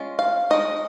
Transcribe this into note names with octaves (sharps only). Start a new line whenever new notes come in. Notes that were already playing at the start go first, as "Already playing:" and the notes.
Already playing: G#3 C#4 F4
F5
G#3 D#4 D#5